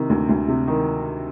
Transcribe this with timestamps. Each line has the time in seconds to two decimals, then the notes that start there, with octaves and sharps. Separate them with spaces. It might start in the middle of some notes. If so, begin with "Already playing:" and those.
Already playing: C3 D#3
0.09 D2
0.29 D2
0.48 C3
0.67 D#3